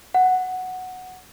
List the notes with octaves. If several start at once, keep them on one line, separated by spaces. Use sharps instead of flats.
F#5